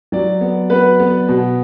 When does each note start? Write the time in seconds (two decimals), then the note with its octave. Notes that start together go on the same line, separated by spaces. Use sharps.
0.12 F#3 D5
0.41 B3
0.70 B3 B4
0.99 B3
1.29 B2